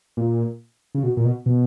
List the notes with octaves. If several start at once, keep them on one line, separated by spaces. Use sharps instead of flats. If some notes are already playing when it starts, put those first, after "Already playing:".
A#2
C#3
B2
A#2
B2
B2